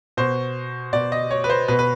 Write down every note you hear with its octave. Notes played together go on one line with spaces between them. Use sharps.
B2 C5
B2 D5
D#5
C#5
B4
C5
B2 B4
B4